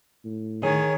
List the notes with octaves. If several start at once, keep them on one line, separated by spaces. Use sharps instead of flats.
A2
D#3 G#4 C#5